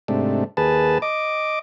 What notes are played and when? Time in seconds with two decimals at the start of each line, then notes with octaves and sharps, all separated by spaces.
0.08 G#2 C3 A3 D4
0.57 D#2 G#4 B4 A5
1.02 D#5 D6